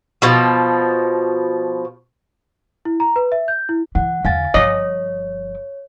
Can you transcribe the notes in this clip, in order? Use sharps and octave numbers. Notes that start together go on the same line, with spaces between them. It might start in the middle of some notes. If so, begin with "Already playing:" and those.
B2 F3
E4
A#5
B4
E5
G6
E4
E3 F#5
E2 D3 F5 G#5 A6
G1 F3 C#5 D#5